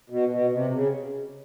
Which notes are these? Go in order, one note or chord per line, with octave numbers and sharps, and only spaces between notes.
B2
B2
C3
C#3